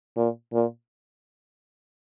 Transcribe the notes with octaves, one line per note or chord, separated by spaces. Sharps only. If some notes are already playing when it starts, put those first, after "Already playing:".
A#2
A#2